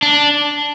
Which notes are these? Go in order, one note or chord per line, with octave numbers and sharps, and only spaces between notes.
D4